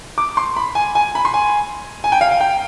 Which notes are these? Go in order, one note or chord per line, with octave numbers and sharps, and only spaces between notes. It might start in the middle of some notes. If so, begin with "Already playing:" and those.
D6
C6
B5
G#5
G#5
B5
C6
G#5
G#5
G5
F5
F5
G5